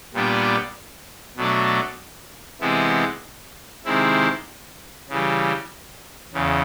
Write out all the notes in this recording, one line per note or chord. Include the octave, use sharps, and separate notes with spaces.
A#2 G3 B3 D4
B2 F#3 A3 D4
C3 E3 G#3 B3 E4
C3 D#3 G#3 C4 E4
C#3 E3 G3
E2 C#3